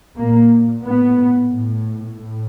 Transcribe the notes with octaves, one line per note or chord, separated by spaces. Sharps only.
A#2 A#3
A2 B3
A2
A2